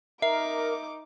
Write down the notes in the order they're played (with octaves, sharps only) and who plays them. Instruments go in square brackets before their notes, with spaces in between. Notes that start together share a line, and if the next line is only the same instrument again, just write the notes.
[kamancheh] D#4 D6 [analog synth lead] A#4 [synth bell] E5